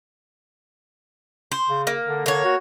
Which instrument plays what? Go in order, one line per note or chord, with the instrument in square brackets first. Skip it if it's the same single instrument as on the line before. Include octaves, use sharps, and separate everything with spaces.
[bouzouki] C5
[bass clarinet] C#3
[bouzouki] A#3
[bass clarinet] D3
[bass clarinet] D3 [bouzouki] A#3 C#5
[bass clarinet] F#4